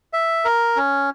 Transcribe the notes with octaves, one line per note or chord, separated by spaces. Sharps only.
E5
A#4
C#4